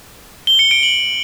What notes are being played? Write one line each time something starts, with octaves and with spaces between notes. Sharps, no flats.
G7
C#7
D7
F#7